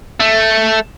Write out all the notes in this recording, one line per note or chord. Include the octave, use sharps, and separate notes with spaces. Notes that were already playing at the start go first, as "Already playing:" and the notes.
A3